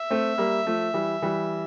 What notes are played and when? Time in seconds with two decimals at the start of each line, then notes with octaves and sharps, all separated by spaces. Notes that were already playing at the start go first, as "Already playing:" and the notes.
Already playing: E5
0.10 A3 C4
0.38 G3 A#3
0.66 F3 A3
0.94 E3 G3
1.22 E3 G3